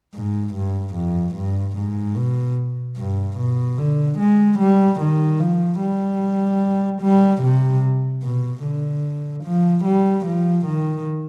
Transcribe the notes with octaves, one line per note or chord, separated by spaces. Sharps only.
G#2
G2
F2
G2
G#2
B2
G2
B2
D3
G#3
G3
D#3
F3
G3
G3
C3
B2
D3
F3
G3
F3
D#3